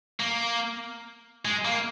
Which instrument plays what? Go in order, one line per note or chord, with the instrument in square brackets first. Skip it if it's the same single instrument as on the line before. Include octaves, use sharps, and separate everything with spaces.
[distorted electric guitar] A#3
G#3
A#3